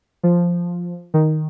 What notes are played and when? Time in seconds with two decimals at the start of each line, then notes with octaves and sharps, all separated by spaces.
0.23 F3
1.14 D#3